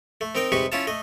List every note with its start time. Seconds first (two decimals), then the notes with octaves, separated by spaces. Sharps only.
0.21 A3
0.35 C4 D#4 A#4 D#5 G5
0.52 C3 G3 G#3 D#4 B4 C#6
0.72 C#4 E4 F4 F5 A5
0.87 A3 D#5